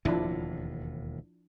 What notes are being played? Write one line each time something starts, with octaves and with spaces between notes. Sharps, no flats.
E1 D#2 A2 F3 D4 E4